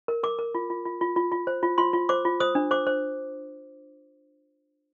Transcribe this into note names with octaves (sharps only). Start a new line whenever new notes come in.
A#4
A#4 D6
A#4
F4
F4
F4
F4
F4
F4
C5
F4
F4 C6
F4
C5 D6
F4
C5 D#6
D4
C5 D6
C5